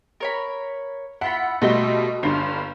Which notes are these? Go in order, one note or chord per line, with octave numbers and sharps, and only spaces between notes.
A#4 C#5 B5
E4 F4 F#5 B5
B2 G3 A3 D#5 C6 E6
G1 G2 F4 A#5